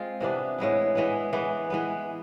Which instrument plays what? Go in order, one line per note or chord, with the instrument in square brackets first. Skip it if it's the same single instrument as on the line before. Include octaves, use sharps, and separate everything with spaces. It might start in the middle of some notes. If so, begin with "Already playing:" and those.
Already playing: [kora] G#3 C4 F4
C3 E3 B3 D4
A2 G#3 B3 E4
E3 G#3 B3
E3 G#3 B3
E3 G#3 B3